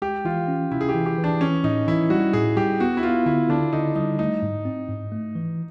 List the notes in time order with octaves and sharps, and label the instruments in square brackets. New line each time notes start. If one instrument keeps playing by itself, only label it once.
[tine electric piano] G#3 [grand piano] G4
[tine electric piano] E3 [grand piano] F4
[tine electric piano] C#4
[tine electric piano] C3 [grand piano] E4
[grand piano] G#4
G4
[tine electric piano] E3
[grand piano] G4
[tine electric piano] E3
[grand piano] D4
[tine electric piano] E3 [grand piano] C#4
[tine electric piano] A2 [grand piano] D#4
[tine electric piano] E3 [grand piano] E4
[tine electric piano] G3 [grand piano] F#4
[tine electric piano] A2 [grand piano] G#4
[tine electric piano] G3 [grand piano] G4
[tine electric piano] B3 [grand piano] F#4
[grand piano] E4
[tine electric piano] B3 [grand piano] F4
[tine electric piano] D3 [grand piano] E4
[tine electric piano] D3 [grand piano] D4
[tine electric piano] D3 [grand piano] D#4
[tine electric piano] G3 [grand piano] D#4
[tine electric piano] A3 [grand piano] D#4
[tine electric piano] G#2
C4
G#2
A3
E3